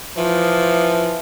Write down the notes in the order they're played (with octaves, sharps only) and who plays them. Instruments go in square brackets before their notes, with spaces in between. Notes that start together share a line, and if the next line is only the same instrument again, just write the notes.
[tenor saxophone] E3 [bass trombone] F3